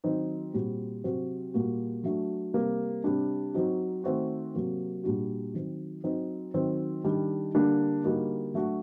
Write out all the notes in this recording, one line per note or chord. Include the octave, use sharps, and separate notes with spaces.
D#3 F#3 C4 D#4
A#2 G3 C4 F#4
C3 F#3 C4 F#4
A#2 G3 A#3 F#4
F#3 A3 D4
C3 G3 A#3
C3 G3 D4
F#3 C4 D#4 F#4
D#3 A3 C4 F#4
C3 F#3 A#3
A#2 G3 D4 F#4
D#3 F#3 C4
F#3 C4 D#4
D#3 F#3 C4
D#3 G3 D4
D3 G3 A#3 D4
D3 G3 A#3 D#4 F#4
F#3 A3 D4 F#4